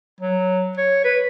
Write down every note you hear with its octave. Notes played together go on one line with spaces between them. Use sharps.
F#3
C#5
B4